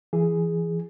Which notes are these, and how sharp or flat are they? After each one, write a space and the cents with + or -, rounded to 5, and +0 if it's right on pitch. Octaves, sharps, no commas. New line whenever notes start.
E3 +25 G#4 +0